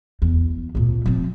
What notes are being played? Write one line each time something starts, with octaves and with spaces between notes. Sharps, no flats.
E2
D2 A#2
F3 C4